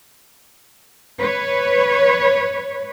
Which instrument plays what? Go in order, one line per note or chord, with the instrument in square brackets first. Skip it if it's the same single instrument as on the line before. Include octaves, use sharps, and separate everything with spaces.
[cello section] B4 C#5